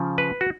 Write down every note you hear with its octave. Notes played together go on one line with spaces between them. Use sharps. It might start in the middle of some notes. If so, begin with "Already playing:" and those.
Already playing: C#3 F3
B4
F#4